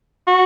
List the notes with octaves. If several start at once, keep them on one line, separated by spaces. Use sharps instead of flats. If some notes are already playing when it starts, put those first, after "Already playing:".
F#4